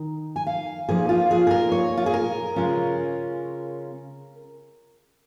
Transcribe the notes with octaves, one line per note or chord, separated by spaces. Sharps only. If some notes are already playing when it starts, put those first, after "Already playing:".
Already playing: D#3 D#4
G#5
F5
A#2 F3 A#3 D#4 G#4
F4
G#4
G#4
A#4
C#5
F4
G#4
A#4
C#3 G#3 C#4 F4